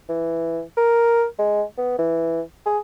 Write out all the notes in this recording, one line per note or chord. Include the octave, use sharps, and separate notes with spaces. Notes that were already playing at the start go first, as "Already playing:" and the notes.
E3
A#4
G#3
B3
E3
G#4